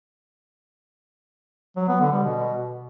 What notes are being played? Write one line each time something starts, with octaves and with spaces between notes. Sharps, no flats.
F#3
B3
D3
G3
B2